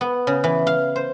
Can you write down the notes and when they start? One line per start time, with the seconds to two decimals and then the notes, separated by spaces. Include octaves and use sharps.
0.01 B3
0.27 C#3
0.44 E3
0.67 F5
0.96 C5